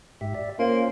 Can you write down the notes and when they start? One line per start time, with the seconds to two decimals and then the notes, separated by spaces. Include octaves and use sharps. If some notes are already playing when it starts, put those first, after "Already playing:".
0.21 G#2 G4 E5
0.34 D5 E5
0.59 A#3 C#4 F4 C5